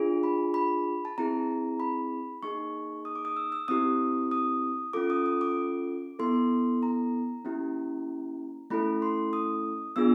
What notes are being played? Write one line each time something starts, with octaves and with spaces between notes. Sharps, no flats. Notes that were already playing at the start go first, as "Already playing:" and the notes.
Already playing: D4 F4 G#4
B5
B5
A5
C4 E4 G#4 A#5
B5
A#3 D#4 G#4 C#6
D#6
D6
D#6
E6
E6
C4 E4 G4 D#6
D#6
C#4 F4 A4 D6
D#6
D#6
D6
B3 E4 A4 C6
A#5
A#3 C#4 E4 G4
A3 C#4 E4 A4 B5
C6
D#6
B3 D4 F4 G#4 E6